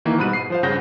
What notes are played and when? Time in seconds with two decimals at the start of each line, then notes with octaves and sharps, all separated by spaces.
0.05 D#3 E3 A#3
0.18 G#2 B2 G3 B5 F#6 D#7
0.33 C7
0.50 F3 C5 F5
0.63 G2 C#3 F#5 G6 A#6